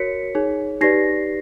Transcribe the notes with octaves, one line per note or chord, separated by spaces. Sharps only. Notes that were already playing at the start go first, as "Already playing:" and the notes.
Already playing: F#4 A#4 C#5 B6 C#7
D#4 G#4 C#5
D#4 G4 B4 D5 A#6 C7